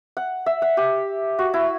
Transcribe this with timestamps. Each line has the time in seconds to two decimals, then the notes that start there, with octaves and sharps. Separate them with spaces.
0.17 F#5
0.46 E5
0.62 F#5
0.77 G4
1.39 F#4
1.54 E4